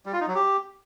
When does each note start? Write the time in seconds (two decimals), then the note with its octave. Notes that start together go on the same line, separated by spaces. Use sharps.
0.06 G3
0.13 F4
0.20 D#4
0.28 F#3
0.35 G4